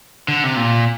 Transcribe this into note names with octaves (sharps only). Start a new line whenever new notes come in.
D3
C3
A#2